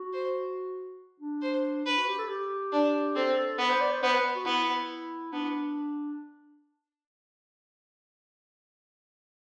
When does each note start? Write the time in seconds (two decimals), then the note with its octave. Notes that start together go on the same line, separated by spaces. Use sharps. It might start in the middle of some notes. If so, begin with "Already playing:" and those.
Already playing: F#4
0.13 C5
1.20 D4
1.42 C5
1.86 D4 B4
1.97 F#4
2.08 G4
2.18 A4
2.29 G4
2.72 D4
3.16 C4 A4
3.37 A4
3.59 B3 B4
3.69 C5
3.81 D5
3.91 C5
4.02 B3 C5
4.13 B4
4.35 F#4
4.45 B3 E4
5.33 B3 D4